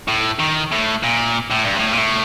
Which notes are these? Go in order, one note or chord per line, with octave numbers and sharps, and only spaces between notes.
A2
D#3
A2
A#2
A2
G2
A2
A#2
A2